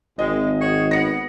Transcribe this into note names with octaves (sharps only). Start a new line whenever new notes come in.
G#1 G#3 D#5
F#4 G#4 C#5
B3 A#6 C#7